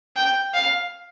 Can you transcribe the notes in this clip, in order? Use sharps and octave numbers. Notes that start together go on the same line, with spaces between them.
G5
F5